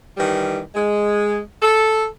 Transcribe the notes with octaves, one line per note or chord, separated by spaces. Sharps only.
D#3 E3 G3
G#3
A4